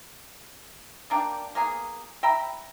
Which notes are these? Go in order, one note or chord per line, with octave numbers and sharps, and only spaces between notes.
A#3 D4 D5 G5
A#3 B3 G#4
E5 G5 A#5 B5